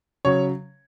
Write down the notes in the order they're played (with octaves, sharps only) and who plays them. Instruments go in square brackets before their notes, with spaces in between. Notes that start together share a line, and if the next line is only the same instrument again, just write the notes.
[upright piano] C#3 F#3 C#5